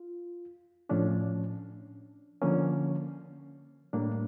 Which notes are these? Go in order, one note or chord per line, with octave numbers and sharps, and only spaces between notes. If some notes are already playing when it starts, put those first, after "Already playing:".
Already playing: F4
A2 F3 C#4 D4
D3 F3 A#3 C#4
A2 G3 A#3 D4